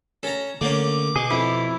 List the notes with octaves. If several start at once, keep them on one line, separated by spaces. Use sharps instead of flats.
C#4 A4 A#5
D3 A3 A#3 C#4 D6
B2 G#4
F2 E4